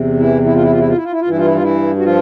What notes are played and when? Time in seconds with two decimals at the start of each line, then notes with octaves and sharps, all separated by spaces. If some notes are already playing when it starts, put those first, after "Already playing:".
Already playing: E2 C3
0.19 E3 E4
0.45 E4
0.54 F4
0.63 E4
0.71 F4
0.79 E4
0.88 F4
0.95 E4
1.03 F4
1.12 E4
1.21 F4
1.25 G2 E3 E4
1.38 F4
1.45 E4
1.54 F4
1.62 E3 E4
1.99 F#4
2.04 F3 F4